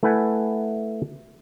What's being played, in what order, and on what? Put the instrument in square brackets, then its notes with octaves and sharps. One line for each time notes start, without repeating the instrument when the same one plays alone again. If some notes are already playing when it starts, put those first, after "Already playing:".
[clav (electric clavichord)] A3 E4 B4 F#5 G#5